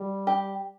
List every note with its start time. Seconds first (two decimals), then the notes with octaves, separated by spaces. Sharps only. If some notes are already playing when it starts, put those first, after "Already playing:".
Already playing: G3
0.27 G4